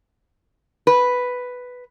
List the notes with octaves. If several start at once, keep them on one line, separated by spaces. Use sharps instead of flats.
B4